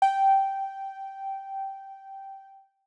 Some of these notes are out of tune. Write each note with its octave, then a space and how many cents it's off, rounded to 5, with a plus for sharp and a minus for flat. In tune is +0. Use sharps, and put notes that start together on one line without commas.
G5 -10